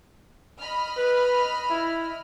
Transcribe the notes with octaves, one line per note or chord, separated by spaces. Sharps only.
D#5 B5 F6
B4
E4